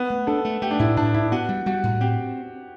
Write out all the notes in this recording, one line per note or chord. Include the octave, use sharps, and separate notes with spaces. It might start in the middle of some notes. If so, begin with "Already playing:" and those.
Already playing: B3
A3
D4 A4
A3
A3 G4
D4
A2 E4
A2 D4
A2 E4
B3 F#4
G3
G3 F#4
A2
C4 G4